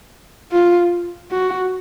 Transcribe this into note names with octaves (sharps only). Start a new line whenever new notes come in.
F4
F#4